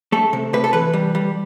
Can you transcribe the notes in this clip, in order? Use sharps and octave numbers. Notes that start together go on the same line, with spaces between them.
A3 A4
C3
C3 B4
A4
E3 B4
G3
G3